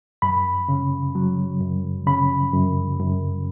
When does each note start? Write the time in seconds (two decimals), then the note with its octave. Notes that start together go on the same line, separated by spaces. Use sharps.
0.22 F#2 B5
0.68 C#3
1.15 F#3
1.61 F#2
2.07 C#3 B5
2.53 F#2
2.99 F#2